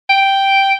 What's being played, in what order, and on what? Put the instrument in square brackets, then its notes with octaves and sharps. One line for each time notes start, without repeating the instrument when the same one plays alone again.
[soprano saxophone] G5